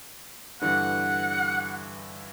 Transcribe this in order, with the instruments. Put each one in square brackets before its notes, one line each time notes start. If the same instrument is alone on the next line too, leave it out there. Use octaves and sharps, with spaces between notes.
[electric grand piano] G2 D3 E3 [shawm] F#5